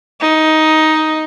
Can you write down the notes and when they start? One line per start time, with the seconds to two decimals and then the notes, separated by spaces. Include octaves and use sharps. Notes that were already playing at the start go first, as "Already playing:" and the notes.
0.21 D#4